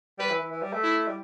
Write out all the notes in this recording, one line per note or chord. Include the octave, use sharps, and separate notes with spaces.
G3 B4
E3
E3
E3
G3
A3
E4
G3